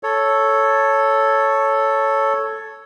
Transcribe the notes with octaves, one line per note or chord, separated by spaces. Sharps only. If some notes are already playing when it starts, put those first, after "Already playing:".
A4 C#5